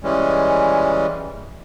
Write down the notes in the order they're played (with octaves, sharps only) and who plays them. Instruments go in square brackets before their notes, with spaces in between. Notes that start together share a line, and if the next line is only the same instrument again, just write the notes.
[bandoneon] E3 G3 G#3 C#4